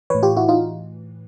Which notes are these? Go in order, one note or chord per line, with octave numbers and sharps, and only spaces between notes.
A2 E3 B4 C#5
F4 G4
E4 F#4
D#4 F4